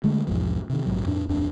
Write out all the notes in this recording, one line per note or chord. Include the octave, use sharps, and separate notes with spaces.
D3 G#3 A3
B1 E2 G#2 F3
C3 D#3
A#1 E2 G#2 F#3
F2 A2 D4
D1 F2 D4